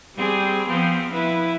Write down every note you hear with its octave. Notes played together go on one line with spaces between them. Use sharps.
G3 C4 G#4
F3 B3 C4
E4 B4